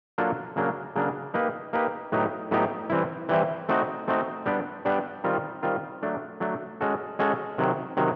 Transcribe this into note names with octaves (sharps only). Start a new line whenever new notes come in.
F#3 A#3 D4 F4 A4
C#3 F#3 A#3 D4
C#3 F#3 A#3 D4
A#3 D#4 G4 B4
A#3 D#4 G4 B4
A2 F#3 B3 D#4 G4
A2 F#3 B3 D#4 G4
E3 G3 C4 E4
E3 G3 C4 E4
A3 C4 D#4 F#4
A3 C4 D#4 F#4
G3 B3 D4 G4
G3 B3 D4 G4
D#3 G3 C4 F4
D#3 G3 C4 F4
F#3 A3 D4
F#3 A3 D4
G#3 C#4 F#4 A4
G#3 C#4 F#4 A4
C3 D#3 F#3
C3 D#3 F#3